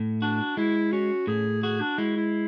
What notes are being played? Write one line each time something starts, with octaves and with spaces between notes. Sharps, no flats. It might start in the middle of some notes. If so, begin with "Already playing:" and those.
Already playing: A2
D4 F#4
G#3 E4
C#4 F#4
A2 G#4
F#4 G#4
D4
G#3 E4
E4